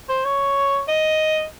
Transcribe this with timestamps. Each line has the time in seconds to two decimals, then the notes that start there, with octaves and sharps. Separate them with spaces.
0.09 C5
0.25 C#5
0.88 D#5